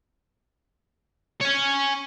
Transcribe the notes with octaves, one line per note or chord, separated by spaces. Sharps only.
C#5 G#5